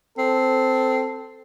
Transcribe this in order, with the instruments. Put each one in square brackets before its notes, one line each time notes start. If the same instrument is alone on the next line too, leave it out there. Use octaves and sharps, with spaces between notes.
[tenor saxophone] C4 [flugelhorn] A4